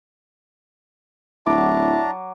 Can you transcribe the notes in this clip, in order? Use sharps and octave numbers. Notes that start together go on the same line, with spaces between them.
D1 F#3 D4 E4 A5 A#5 D6